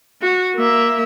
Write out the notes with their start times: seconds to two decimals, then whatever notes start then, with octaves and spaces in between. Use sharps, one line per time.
0.22 F#4
0.56 A#3 E5